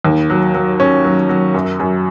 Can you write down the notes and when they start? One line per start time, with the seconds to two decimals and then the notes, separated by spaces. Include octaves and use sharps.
0.05 D#2
0.30 F#3
0.54 F#3
0.80 C#4
1.05 F#3
1.29 F#3
1.54 F#2
1.80 F#2